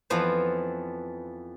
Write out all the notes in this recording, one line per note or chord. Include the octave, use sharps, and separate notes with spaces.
F2 E3 F3 B3 C5